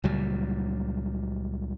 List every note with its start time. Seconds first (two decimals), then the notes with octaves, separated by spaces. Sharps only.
0.04 C#2 A#2 F#3 G3